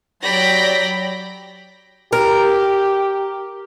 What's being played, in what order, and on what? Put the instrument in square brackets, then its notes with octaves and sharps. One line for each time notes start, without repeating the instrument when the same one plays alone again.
[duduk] F#3 [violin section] G4 D5 A#6 [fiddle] G5 B5
[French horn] G4 [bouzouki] A#4